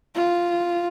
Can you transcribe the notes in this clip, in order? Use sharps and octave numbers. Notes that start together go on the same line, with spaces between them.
F4